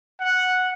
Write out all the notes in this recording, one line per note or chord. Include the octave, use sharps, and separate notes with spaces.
F#5